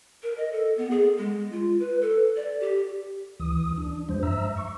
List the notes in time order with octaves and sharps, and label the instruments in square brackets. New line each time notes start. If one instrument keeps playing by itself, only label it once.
[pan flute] A#4
D#5
A4
B3
G#4
G#3
F4
B4
A4
D5
G4
[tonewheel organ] D2 E3 D#6
D4
F2 F3 G#3 C5
G2 E5 A#5 E6
C#6